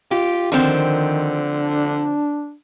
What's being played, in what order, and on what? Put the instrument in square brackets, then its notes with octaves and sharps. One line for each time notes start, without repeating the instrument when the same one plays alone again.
[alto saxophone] F4 [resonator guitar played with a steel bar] G4
[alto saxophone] D3 [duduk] D#3 [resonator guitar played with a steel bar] F3 C4
[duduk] D4